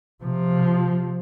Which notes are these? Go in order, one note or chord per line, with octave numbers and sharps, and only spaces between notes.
C3 F3